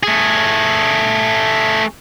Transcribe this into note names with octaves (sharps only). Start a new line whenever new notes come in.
A3 G#4